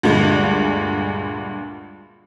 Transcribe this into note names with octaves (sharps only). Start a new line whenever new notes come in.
D2 G2 A#2 G#3